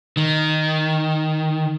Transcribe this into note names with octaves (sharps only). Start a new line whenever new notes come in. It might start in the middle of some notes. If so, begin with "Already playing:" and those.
D#3